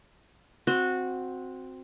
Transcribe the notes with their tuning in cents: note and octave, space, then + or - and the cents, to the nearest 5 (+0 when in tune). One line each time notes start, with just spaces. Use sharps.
C4 +0 F#4 -15